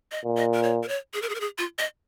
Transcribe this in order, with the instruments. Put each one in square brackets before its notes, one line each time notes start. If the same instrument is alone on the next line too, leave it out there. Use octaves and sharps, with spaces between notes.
[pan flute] D#5
[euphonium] A#2
[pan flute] D#5
A#4
C#5
A#4
C#5
G#4
A#4
G#4
A#4
G#4
F4
D#5